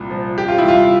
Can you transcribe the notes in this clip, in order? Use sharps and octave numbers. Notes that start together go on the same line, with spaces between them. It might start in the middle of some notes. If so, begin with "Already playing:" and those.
Already playing: C2 A#2
F3
F3 G4
F4
E4
C2 F4